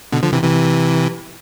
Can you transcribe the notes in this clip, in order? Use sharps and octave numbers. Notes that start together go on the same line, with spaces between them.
B2 D3
D3 F3
C3 E3
C3 E3